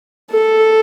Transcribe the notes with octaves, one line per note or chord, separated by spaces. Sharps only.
A4